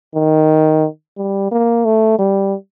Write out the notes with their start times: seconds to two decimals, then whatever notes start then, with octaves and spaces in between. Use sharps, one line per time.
0.15 D#3
1.18 G3
1.52 A#3
1.85 A3
2.19 G3